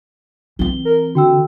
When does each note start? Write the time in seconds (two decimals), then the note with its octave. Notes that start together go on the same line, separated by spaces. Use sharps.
0.59 E3 C4 G7
0.85 A#4
1.15 D3 F#4 G5 E6